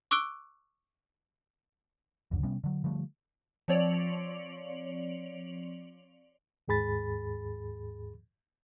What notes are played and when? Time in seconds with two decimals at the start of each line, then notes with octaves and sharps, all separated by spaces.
0.11 C#6 D6 E6 F#6 D7 G7
2.31 F1 C#2 F#2 D3
2.43 C3 G3 B3 C#4
2.64 D3 F#3
2.84 D3 F3 G3 A3
3.68 F3 C4 C#5 D5 F7 F#7
6.68 D#2 G#2 G#4 B5 A6